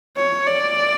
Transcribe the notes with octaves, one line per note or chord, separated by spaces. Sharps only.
C#5
D5